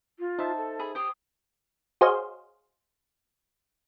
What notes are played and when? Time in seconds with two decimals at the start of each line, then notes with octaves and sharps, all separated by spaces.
0.19 F4
0.39 D#4 C5 E5 A5
0.58 A4
0.79 G#4 B5 D#6
0.95 G4 C5 D#6
2.01 F#4 G#4 C5 C#5 D#5 F5